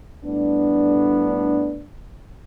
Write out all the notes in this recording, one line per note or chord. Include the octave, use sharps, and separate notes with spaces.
A2 G3 A3 B3 D4